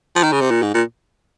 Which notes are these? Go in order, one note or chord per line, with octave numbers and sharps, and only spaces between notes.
F3
D#3
C#3
C3
A#2
G#2
A#2